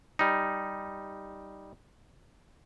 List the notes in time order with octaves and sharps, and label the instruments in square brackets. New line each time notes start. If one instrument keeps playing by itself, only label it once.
[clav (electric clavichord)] G3 D#4